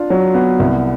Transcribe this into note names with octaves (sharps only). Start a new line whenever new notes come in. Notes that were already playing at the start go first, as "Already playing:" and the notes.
Already playing: D4 F4
F#3
B3
C2